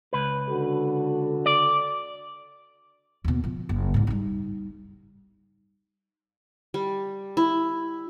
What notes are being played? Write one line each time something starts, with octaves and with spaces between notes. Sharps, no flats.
C#2 B4
D3 F#4 A4
D5
D#2 B2
B2 F3
F#1
C2 G#2
G3 D#4
G3
E4